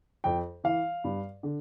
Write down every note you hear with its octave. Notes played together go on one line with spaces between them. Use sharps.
F2 G5
E3 F5
G2
D3